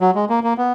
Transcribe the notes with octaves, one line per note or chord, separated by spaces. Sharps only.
F#3
G#3
A#3
A#3
B3